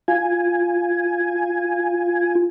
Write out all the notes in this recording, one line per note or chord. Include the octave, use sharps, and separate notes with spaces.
F4 G#5